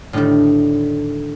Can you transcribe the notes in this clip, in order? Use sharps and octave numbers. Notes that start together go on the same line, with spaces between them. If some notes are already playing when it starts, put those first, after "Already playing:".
A2 D3 D#3 G3 A3